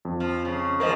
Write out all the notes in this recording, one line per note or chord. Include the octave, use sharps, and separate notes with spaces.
F2
F3
C#3
G#2 F3 A#4 C5 D#5